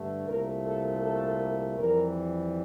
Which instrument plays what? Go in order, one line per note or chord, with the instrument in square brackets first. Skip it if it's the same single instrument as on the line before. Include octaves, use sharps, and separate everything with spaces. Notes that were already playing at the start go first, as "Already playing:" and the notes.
Already playing: [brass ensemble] G2 D3 A3
C2 A#2 A3 A#4
A4
A4
F2 E3 G3 A#4